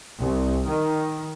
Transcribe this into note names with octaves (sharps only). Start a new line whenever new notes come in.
C2
D#3